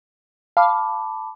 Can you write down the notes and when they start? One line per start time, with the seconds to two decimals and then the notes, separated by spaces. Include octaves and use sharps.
0.57 F5 A5 B5 D6